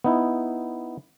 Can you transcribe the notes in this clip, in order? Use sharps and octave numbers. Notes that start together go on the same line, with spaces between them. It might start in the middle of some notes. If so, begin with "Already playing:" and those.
B3 D#4 E4